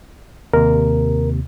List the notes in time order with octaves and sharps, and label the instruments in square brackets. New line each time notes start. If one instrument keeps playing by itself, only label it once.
[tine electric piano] D#2 C3 [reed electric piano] A#4